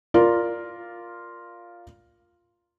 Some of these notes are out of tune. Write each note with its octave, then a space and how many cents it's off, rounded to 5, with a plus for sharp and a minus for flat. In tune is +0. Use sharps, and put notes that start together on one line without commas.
F4 +0 A#4 +0 D5 +0